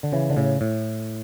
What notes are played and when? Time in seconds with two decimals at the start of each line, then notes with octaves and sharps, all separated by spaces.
0.03 D3
0.12 C#3 E3
0.30 D3
0.37 A2 C#3
0.61 A2